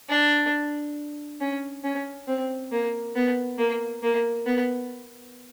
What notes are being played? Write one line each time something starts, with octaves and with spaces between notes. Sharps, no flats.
D4
C#4
C#4
C4
A#3
B3
A#3
A#3
B3